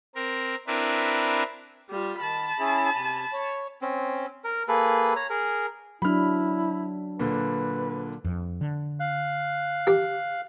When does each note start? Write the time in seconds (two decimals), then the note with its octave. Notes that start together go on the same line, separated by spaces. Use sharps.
0.15 C4 A#4
0.67 C4 D4 E4 A#4 B4
1.90 G3 F4
2.21 D#3 A5 B5
2.59 C#4 E4 G#4
2.95 C3 G#5
3.33 C#5
3.82 C4 C#4
4.44 A#4
4.68 A#3 G#4 A4 B4
5.16 C#5 A#5
5.30 G#4 A#4
6.02 F#3 D4 E4 B5 F6
7.19 A#2 D3 B4
8.25 F2
8.61 D3
9.00 F5 F#6
9.87 G4